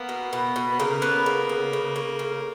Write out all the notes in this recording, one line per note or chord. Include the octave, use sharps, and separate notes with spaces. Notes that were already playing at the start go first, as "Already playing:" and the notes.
Already playing: A#3 B3
B2
B2
B2
B3
C#3 A#3
B3
C#3
C#3
C#3
C#3
C#3